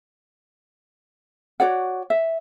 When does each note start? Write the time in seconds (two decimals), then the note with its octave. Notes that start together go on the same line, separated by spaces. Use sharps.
1.60 F#4 C#5 D5 F#5
2.10 E5